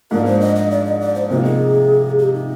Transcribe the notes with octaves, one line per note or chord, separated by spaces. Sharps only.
G#2 F3 A#3 D4 A#4
C5
D#5
D#5
D5
D#5
D5
C5
C3 F3 A#3 D#4 A#4
G#4
G4
D#4